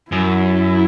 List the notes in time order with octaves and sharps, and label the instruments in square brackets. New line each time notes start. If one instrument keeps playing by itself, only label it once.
[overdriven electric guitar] F#2 [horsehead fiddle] E4